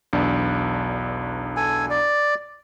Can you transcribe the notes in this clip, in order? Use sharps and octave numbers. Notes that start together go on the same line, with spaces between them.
B1 E2 D4
A4 G#5
D5